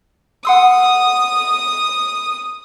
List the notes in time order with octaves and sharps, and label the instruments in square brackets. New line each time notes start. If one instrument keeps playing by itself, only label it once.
[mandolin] F#5 C6 E6 [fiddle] D#6